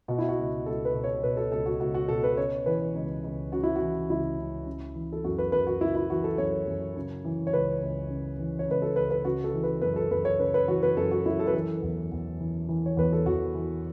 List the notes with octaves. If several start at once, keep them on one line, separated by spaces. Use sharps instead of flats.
B2 F#4
E4
F#4
C#2
C#2 A4
B4
B2
C#5
B2 B4
A4
C#2 A4
F#4
C#2 F#4
F#4
B2 A4
B4
C#3 C#5
E3 B4
C#2
C#2
C#3 F#4
E4
F#4
E3
C#2 E4
C#2
C#3
E3
A4
F#2 F#4
B4
F#2 B4
F#4
C#3 E4
E4
E3 F#4
A4
F#2 C#5
F#2
C#3
E3
C#5
C#2 B4
C#2
C#3
E3
C#5
C#2 B4
A4
C#2 B4
B4
C#3 F#4
A4
E3
B4
F#2 B4
A4
F#2 B4
C#5
C#3 B4
B4
E3 F#4
B4
F#2 A4
F#4
F#2 E4
A4
B4
E3 A4
E2
E2
E3
E3
C#5
E2 B4
A4
E2 F#4
E3